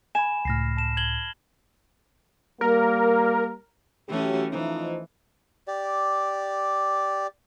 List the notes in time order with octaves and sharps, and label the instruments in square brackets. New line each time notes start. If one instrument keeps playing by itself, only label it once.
[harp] G#5 [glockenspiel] B5 E7
[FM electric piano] C#2 A2 [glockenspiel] F6 A#6 C7
[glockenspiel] A5 E7
G#6 F#7 G7
[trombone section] G3 A#3 [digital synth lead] A#4
[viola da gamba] E3 A3 C#4 [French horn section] F#3 G4
[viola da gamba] E3 [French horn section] F3 D#4
[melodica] G4 D5